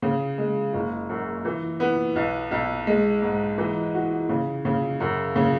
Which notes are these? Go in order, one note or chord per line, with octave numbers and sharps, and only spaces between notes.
C#3
G#3
F#1
F#2
E3
B3
B1
B1
G#3
G#2
E3
F#4
C#3
C#3
F#2
C#3